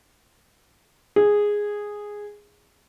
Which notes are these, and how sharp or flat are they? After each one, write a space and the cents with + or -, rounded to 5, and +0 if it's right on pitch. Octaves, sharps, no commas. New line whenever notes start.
G#4 -5